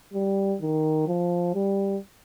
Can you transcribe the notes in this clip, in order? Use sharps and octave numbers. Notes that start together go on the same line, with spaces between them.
G3
D#3
F3
G3